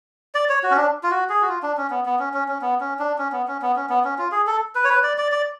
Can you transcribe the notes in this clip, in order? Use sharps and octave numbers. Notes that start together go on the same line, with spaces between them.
D5
C#5
F#4
C#4
D4
F4
F#4
G#4
F#4
F4
D4
C#4
B3
B3
C#4
C#4
C#4
B3
C#4
D4
C#4
B3
C#4
B3
C#4
B3
C#4
F4
G#4
A4
B4
C#5
B4
D5
D5
D5